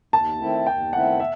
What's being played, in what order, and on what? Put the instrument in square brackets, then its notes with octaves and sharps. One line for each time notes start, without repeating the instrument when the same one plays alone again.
[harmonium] D#2 [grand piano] A5
[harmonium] D#3 A3 C4 E4
[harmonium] D#2 [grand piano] G5
[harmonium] D#3 A3 C4 E4 [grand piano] F#5
[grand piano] E5